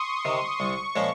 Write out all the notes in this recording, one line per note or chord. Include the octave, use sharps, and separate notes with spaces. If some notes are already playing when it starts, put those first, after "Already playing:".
Already playing: C6 C#6 D#6
C3 D#3
C2 C#6
A#2 F3 G#3 C#4